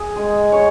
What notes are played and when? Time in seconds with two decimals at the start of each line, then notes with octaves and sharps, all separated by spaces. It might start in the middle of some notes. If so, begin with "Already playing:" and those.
Already playing: G#4
0.16 G#3
0.52 C#5